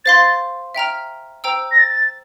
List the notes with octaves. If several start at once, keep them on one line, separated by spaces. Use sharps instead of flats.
C5 F5 C6 A6
E5 G5 A#5 F6
C5 G5 A#5 E6
A#6
A6